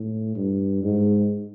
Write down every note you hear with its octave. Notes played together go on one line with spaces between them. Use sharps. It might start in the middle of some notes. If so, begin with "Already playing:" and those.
Already playing: A2
G2
G#2